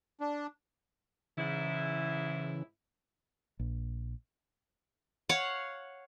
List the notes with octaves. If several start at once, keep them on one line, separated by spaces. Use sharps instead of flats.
D4
G#2 C#3 E3 E4
A#1
C#5 F5 F#5